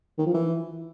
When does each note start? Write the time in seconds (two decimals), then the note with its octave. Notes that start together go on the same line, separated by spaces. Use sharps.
0.19 D#3
0.26 F3
0.34 E3